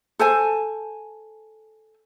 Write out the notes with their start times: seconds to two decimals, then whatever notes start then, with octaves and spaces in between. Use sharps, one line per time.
0.19 A4 C5 G#5